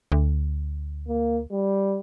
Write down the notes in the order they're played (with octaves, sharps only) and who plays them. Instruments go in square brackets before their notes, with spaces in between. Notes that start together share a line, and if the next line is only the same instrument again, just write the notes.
[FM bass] D2
[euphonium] A#3
G3